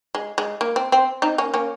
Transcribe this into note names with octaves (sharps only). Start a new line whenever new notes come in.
G#3
G#3
A#3
C4
C4
C4 D#4
A#3 C#4
A#3 C#4